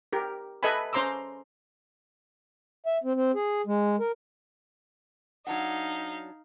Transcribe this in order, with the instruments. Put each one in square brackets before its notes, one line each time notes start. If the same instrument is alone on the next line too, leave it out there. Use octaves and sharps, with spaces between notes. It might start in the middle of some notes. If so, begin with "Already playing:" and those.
[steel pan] G4 A#4
A4 B4 D#5 E5 G#5 B5
C#4 C5 A#5 C6 D6 E6
[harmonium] E5
C4
C4
G#4
G#3
A#4
[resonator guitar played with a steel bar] F#3 D4 F#5 [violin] D#4 F5